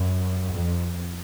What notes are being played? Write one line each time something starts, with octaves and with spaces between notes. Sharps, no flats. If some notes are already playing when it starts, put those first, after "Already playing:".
Already playing: F#2
F2